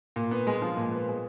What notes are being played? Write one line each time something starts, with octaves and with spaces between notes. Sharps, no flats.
A#2
B3
G#3
F3
A#2
B3
G#3